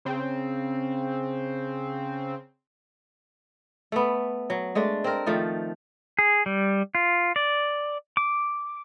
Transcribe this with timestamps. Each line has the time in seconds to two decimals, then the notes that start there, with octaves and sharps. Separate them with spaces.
0.05 C#3 C4
3.92 A3 B3
4.50 F#3
4.75 G#3 A3 D4
5.04 C4 A#4
5.26 D#3 F3 A3
6.19 G#4
6.46 G3
6.95 F4
7.36 D5
8.17 D6